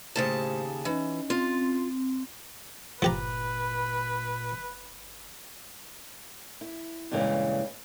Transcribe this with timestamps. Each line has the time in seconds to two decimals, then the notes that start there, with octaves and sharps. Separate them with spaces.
0.16 D#2 A2 C#3 C5 A5
0.85 E3 C#4 D#4
1.30 C4 F4
3.02 G1 A#2 F3 G4 B4 A#5
6.61 E4
7.11 G2 A#2 C#3 E3 G#3